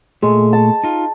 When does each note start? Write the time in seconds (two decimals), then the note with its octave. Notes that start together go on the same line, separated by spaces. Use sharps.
0.22 A#2 G#3 A3
0.53 A5
0.84 D#4 F4